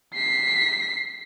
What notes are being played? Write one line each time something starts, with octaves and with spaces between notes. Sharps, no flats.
B6 C7